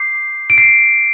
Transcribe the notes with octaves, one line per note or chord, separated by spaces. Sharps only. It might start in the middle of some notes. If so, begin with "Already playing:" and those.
Already playing: D6 G6 C7
D7
C7